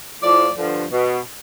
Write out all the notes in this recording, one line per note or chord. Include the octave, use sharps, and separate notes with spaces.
A2 F3 D5
G2 D3 F3
B2